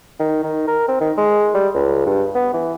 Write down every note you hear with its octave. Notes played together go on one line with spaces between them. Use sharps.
D#3
D#3
A#4
C4
D#3
G#3
G3
C#2
G2
B3
E3